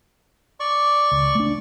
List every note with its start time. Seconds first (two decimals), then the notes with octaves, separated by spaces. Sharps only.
0.60 D5 C#6
1.12 C#2
1.35 A3 D4